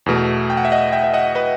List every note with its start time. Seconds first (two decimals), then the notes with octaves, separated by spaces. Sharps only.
0.06 E2 B2 A3
0.50 G5
0.57 F#5
0.65 E5
0.72 D#5 F#5
0.92 E5 G5
1.04 E5
1.14 D#5 F#5
1.35 B4 D#5